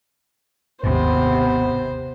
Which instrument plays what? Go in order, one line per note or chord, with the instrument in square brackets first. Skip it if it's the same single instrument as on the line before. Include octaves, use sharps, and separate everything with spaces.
[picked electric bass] G#1 D#2 [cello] C3 [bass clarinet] B3 [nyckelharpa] C5